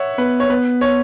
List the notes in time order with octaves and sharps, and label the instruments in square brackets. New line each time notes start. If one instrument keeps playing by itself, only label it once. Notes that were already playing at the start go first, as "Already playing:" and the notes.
Already playing: [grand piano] C#5 E5 F#5
[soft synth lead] B3 [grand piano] B4
[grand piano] C#5
[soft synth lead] B3 [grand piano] B4
[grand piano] C#5